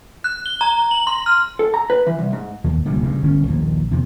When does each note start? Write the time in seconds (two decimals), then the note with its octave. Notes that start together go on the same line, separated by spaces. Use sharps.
0.24 F#6
0.46 G7
0.61 A#5
0.91 F#7
1.07 C6
1.26 F6
1.59 A4
1.74 A#5
1.90 B4
2.06 E3
2.19 C2
2.33 G#2
2.64 D#2
2.85 D1 A#1 C3 G3
3.03 G2 C#3
3.22 G1 C4 C#4
3.48 A#1 D#2 A#2
3.91 E2 C3